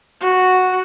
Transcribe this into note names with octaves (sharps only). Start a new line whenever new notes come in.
F#4